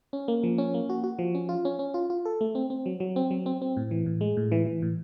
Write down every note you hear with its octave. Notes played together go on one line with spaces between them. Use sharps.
C#4
A#3
F3
C#4
A#3
F#4
F#4
F3
C#4
F4
C#4
C#4
F4
F4
A4
A3
C4
C4
F#3
F#3
C4
F#3
C4
C4
A2
E3
A2
G#3
A2
E3
E3
A2